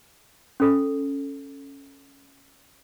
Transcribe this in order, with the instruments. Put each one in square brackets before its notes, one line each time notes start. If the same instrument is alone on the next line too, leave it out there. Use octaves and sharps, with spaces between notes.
[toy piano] C#4 A4